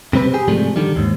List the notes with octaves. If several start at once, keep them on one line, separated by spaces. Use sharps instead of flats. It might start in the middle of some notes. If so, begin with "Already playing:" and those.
C3 G3 C4 B4
G4 G#4
G#2 C3 F3 G3 A3
D3 D#3 G3
D#2 G#2